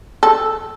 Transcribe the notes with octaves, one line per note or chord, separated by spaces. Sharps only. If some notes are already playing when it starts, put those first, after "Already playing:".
A4